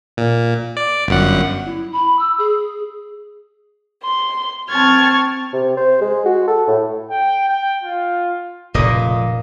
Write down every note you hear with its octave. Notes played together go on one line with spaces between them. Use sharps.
A#2
D5
G1 F#2 F#5
E4
B5
E6
G#4
C6
C4 A5 C#6 F6 G#6
C3
C5
G#3
F#4
A4
A2
G5
G5
F4
F1 A#2 C#3 A#3 D#5